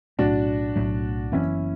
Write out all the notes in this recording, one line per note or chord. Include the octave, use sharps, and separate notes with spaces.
B1 A2 F#3 A3 D4 F#4
B1 A2 F#3 A3
F#1 F#2 E3 B3 C#4 E4